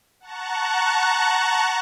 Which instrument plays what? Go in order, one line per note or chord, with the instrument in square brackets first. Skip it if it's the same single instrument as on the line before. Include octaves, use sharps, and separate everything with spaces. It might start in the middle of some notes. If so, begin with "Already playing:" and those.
[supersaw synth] F#5 A5 A#5 C#6 F#6